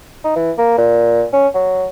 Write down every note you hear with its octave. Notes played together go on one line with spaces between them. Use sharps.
D#4
E3
A#3
A#2
C#4
F#3